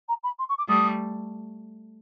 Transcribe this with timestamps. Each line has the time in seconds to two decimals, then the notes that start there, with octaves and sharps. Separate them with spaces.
0.08 A#5
0.23 B5
0.39 C6
0.49 C#6
0.58 D6
0.68 G3 A3 D#6